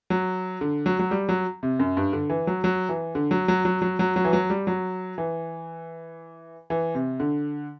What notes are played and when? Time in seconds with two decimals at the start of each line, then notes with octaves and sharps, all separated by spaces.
0.10 F#3
0.61 D3
0.86 F#3
0.99 F#3
1.11 G3
1.29 F#3
1.63 C3
1.79 F#2
1.97 G2
2.13 D3
2.30 E3
2.47 F#3
2.64 F#3
2.89 E3
3.15 D3
3.31 F#3
3.48 F#3
3.65 F#3
3.82 F#3
3.99 F#3
4.16 F#3
4.25 E3
4.33 F#3
4.50 G3
4.67 F#3
5.18 E3
6.70 E3
6.95 C3
7.20 D3